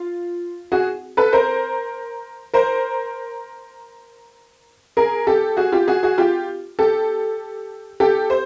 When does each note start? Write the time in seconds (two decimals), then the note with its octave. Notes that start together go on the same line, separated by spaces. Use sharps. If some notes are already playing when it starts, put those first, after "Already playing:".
Already playing: F4
0.72 F#4 G#4
1.17 A4 B4
1.33 A#4 C5
2.54 A#4 C5
4.97 G#4 A#4
5.27 G4 A4
5.57 F#4 G#4
5.72 F4 G4
5.88 F#4 G#4
6.03 F#4 G#4
6.18 F4 G4
6.79 G4 A4
8.00 G4 A4
8.30 C5